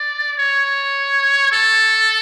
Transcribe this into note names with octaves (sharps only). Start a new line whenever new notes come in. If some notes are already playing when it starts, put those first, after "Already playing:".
Already playing: D5
C#5
A4